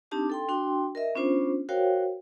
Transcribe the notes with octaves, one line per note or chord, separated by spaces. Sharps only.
C4 D4 D#4 G4 A5 D6
A4 G5 C6
D4 F#4 G5 C6
A#4 D#5 E5
B3 C#4 D4 F4 C5
F#4 A#4 C5 C#5 F5 G5